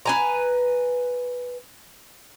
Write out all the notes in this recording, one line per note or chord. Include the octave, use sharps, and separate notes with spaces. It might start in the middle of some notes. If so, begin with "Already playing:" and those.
B4 G#5 A#5